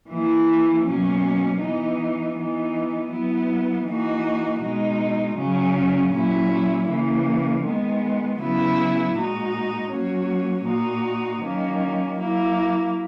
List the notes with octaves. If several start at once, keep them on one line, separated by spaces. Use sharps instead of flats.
E3 A#3 E4
B2 F#3 A#3 C#4
E3 B3 D#4
E3 B3 D#4
F#3 B3 E4
E3 A#3 D#4 F#4
B2 G#3 D#4
C#3 F#3 C#4
A#2 F#3 C#4 E4
C#3 E3 A#3
D#3 G#3 B3
C#3 F#3 B3 E4
A#2 G#3 D#4 F#4
F#3 A#3 C#4 F#4
A#2 A#3 D#4 F#4
D#3 F#3 A#3 C#4
F#3 A#3 E4